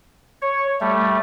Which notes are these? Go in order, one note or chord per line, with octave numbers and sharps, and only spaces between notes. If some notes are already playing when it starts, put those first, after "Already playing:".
C#5
G3 A3